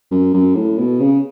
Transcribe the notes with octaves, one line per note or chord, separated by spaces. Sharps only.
F#2
F#2
A2
B2
C#3